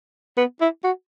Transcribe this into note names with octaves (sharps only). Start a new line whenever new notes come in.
B3
E4
F#4